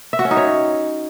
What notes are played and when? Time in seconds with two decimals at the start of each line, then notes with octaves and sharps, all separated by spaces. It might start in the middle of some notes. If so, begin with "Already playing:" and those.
0.13 E5
0.19 F#4
0.25 C#4
0.31 D#4
0.37 C#5